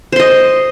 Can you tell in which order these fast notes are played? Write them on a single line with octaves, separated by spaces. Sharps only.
C5 C6 D#5